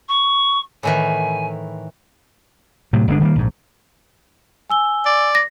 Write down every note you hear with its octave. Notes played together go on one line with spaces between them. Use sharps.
C#6
A2 D#3 E3 G#5
A2 C3 F#3
G1 D3 G#3 D4
D#3 G3 A3 A#3
A#1 G#2
G#5 E6 G7
D5
A#6